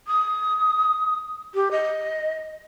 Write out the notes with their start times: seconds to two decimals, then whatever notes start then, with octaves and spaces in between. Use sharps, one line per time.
0.08 D#6
1.54 G4
1.71 D#5